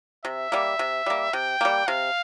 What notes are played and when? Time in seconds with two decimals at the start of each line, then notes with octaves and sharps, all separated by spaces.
0.24 C3 E5
0.52 G3 A#3
0.79 C3
1.06 G3 A#3
1.33 C3 G5
1.61 G3 A#3
1.88 C3 F5